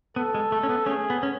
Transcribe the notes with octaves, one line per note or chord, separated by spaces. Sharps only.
B3 A4
G#3
A3
C#4
B3
A3 C#4 G#4
B3
C#4